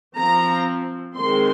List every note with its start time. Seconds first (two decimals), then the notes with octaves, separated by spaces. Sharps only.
0.16 F3 C4 A#5
1.15 D#3 G#3 C4 C6